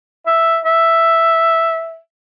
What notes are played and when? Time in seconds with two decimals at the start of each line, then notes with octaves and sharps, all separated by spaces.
0.27 E5
0.65 E5